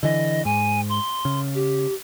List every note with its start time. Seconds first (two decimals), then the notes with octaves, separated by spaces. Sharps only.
0.03 D3 E3 D#5
0.45 G#2 G#5
0.89 C6
1.25 C#3
1.55 G4